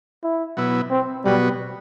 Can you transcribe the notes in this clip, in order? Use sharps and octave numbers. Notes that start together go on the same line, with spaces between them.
E4
B2 F#3 B3 E4
C4
B2 F#3 G3 B3 F#4